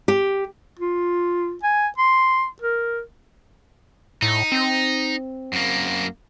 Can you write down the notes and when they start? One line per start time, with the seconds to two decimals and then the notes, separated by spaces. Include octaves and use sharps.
0.08 G4
0.79 F4
1.63 G#5
1.98 C6
2.62 A#4
4.22 A2 D#4
4.52 C4
5.53 F#2 A#3